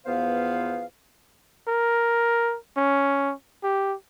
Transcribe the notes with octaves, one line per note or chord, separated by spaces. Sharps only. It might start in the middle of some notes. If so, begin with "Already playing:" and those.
E2 F3 B3 B4 C5 F5
A#4
C#4
G4